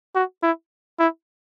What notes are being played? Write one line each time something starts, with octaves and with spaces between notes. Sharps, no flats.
F#4
E4
E4